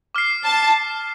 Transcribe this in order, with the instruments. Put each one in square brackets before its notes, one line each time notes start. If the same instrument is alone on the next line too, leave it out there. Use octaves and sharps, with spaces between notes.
[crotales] D6 F6 C7
[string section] A5